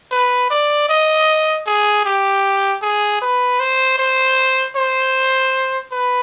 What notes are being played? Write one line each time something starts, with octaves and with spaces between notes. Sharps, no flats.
B4
D5
D#5
G#4
G4
G#4
B4
C5
C5
C5
B4